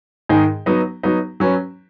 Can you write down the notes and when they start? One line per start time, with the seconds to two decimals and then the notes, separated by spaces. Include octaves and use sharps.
0.29 G#2 D#3 G#3 D#4 G#4
0.66 F#3 B3 D#4
1.03 F#3 B3 D#4
1.40 F#3 C#4 B4